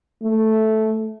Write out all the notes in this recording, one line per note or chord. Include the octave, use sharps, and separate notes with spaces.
A3